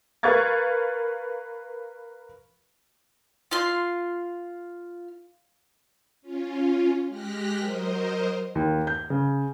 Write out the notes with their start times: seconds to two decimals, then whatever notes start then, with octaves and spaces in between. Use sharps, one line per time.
0.23 A#4 B4 F5 C#6 G#6 A6
3.51 F4 C6
6.22 C#4 F4
7.09 G#3 G4 F6 F#6 A#6 B6
7.58 F#3 A#4 C5 D#5
8.55 D#2
8.87 G6
9.10 C#3